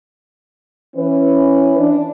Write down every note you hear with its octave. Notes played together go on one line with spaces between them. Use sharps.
E3 C#4 B4
D4